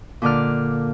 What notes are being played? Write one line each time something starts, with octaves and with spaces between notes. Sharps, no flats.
A#2 D3 D5 F6